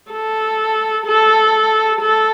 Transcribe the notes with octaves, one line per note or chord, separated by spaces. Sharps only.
A4
A4
A4